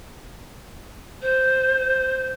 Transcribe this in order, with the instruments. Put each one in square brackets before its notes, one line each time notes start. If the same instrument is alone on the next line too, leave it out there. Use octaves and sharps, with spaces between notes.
[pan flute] C5